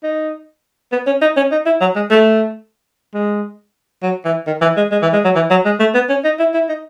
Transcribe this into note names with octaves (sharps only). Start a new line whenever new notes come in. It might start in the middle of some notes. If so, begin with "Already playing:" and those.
D#4
B3
C#4
D#4
C#4
D#4
E4
F#3
G#3
A3
G#3
F#3
E3
D#3
E3
G#3
G#3
E3
G#3
F#3
E3
F#3
G#3
A3
B3
C#4
D#4
E4
E4
D#4